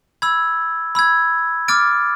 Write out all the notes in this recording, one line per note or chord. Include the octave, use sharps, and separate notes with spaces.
B5 E6 G#6
B5 E6 G#6
D6 F6 A6 D7